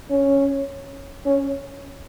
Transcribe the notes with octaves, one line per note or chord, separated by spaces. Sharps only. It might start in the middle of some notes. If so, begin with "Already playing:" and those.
C#4
C#4